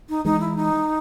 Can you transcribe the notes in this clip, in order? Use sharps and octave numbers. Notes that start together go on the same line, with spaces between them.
D#4
E3 G#3 D#4
E4
D#4